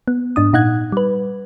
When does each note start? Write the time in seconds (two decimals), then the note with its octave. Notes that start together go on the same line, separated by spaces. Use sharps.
0.08 B3
0.36 G#2 D4 D#6
0.53 A#2 D#4 F#5 F#6 G#6
0.92 G3 B4